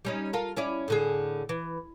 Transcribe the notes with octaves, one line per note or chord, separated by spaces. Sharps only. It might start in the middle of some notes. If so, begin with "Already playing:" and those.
G3 C#4 D#4
F4 A4 A#4
C#4 E4 D5
A2 D3 G#4
E3